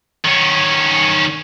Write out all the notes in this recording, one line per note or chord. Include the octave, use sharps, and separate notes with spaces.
D#3 C#4